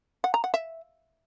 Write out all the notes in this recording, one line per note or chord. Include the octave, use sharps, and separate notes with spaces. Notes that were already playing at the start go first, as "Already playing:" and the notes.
F#5
A#5
F#5
E5